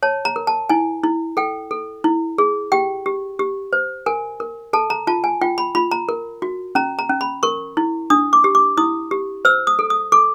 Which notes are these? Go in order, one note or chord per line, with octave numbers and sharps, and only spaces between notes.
C#5 A5
A#5
A#4
A5
E4 G#5
E4
A4 G5
A4
E4
G#4
G4 G5
G4
G4
C5
A#4 G#5
A#4
A4 A5
A#5
F4 A5
G#5
F4 G5
B5
F4 B5
A#5
A#4
F#4
C#4 A#5
A#5
C#4
B5
A#4 C#6
E4
D4 D#6
D6
G4
D6
E4 D#6
G4
C5 E6
D#6
A4
D#6
A4 D6